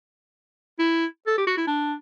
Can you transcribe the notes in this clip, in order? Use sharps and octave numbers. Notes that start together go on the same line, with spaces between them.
E4
A4
G4
F#4
E4
D4